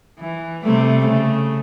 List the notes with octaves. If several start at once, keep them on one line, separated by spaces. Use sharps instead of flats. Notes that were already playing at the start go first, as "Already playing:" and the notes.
E3
C3 G3 A3
C#3 A3